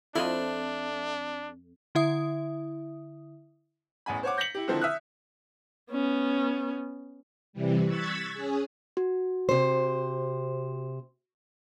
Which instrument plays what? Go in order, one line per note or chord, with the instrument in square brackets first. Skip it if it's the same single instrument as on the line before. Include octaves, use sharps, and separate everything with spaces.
[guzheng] F2 [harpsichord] A3 B5 C6 [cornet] D4 [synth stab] E4 F4 D#5
[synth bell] D3 E4 E5 D#6
[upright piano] A1 E2 G#5 B5
C5 C#5 F#5 D6
G6 A#6 B6 C#7 F#7
E4 G4
D3 D#3 F3 C4 E4 A4
E5 D#6 F6 F#6
[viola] B3 C#4
[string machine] C3 E3 G3
C#6 E6 F#6 G#6 A6 B6
C#4 G#4
[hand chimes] F#4
[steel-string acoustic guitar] C3 C5